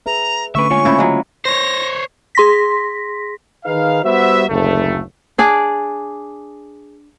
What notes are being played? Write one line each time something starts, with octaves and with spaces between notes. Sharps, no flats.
G#4 B4 E5 A#5
D3 A3 C#4 B4 E5 C#6
G#3 A#3 F4 C#5 G#5
C#3 A3 A#3 E4 C5
F#3 G#3
C5 C#5 A#6
G#4 C6 A#6 B6
D#3 D#4 G#4 B4 F5
G3 B3 F#4 C5 E5
F#1 D2 A3
D4 G#4 D5